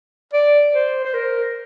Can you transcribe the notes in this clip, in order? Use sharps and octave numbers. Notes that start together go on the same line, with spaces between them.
D5
C5
C5
A#4